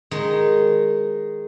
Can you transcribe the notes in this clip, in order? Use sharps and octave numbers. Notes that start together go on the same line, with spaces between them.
D#3 G#3 D#4